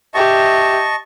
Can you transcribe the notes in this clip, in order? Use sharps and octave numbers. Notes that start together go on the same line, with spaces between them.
G4 D#5 E5 A5 C#6